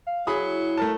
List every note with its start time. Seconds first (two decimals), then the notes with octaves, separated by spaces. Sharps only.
0.07 F5
0.27 F#3 E4 G#4 B5 D#6
0.78 A3 A#4 A5